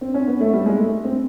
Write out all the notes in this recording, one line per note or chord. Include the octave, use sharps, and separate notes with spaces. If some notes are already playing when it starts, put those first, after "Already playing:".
C4
C#4
B3
A3
G3
G#3
A3
C4